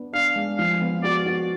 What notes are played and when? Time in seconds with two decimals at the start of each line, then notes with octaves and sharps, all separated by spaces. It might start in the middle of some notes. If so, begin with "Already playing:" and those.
Already playing: B3 D4
0.13 D4 F5
0.36 G#3
0.58 F3 F5
0.81 B3
1.03 F#4 D5
1.26 F#4